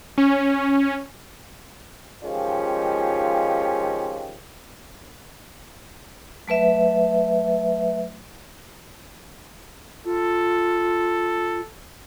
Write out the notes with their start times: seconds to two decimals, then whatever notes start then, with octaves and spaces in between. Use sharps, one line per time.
0.18 C#4
2.24 D#3 F3 G#3 C#4 F4 G4
6.48 F#3 A3 B4 E5
10.05 F4 A4